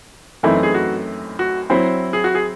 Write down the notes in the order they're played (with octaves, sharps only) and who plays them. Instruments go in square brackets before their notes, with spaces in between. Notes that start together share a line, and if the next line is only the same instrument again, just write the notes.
[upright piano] F#2 E3 A3 C4 D#4 [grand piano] E4
[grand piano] G#4
F#4
F#4
[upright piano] F#3 C4 E4 C5
[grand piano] G#4
F#4
G#4